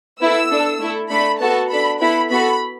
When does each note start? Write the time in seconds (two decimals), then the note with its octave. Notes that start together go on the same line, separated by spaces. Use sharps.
0.21 B3 E4 A4 E6
0.51 D4 A4
0.80 A3 E4 A4
1.10 A3 D4 A4 B5
1.40 B3 F#4 A4 A5
1.70 D4 A4 B5
2.00 B3 E4 A4 B5
2.30 B3 F#4 A4 B5